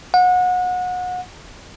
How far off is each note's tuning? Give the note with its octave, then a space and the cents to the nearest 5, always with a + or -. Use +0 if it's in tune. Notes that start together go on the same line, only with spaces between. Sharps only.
F#5 -30